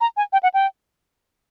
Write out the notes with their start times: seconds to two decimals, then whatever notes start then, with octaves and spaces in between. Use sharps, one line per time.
0.01 A#5
0.17 G#5
0.33 G5
0.43 F#5
0.54 G5